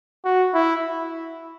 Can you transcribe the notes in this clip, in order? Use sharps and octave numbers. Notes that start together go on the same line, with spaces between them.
F#4
E4